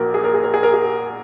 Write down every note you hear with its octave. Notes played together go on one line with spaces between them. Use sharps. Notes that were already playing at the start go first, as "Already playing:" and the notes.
Already playing: A#1 A#2 F#4 A#4
G#4
A#4
G#4
A#4
G#4
A#4
G#4